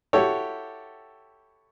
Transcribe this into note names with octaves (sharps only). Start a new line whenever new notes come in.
E4 F#4 G4 A4 C#5